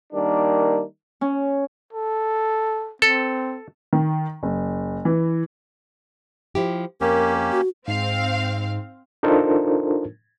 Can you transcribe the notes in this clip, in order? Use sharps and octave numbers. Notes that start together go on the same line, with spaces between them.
D#3 G3 A#3 D4
C#4
A4
C4 A4
D#3
F#1
E3
F3 E4 G4
F2 A#3 C#4 G4 A#4
F#4
G#2 C4 F5
D4 D#4 F4 A4 A#4 C5